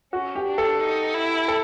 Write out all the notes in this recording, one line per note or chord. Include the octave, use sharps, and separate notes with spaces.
C#4 F#4
G4
D4
A4
D#4
E4
A4